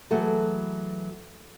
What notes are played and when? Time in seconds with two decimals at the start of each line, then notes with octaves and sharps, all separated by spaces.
0.11 E3 F#3 A3 G#4 A4